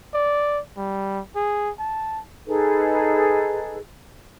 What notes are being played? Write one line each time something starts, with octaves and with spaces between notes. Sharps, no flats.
D5
G3
G#4
A5
D#4 G#4 A4 B4